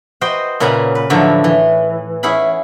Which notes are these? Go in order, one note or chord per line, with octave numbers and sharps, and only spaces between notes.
F#4 B4 C5 D#5 G5
A#2 C#3 B4 F#5 G#5 A#5
B4
A2 D3 F3 F#3 E4
E3
C#4 E4 G#4 F#5 B5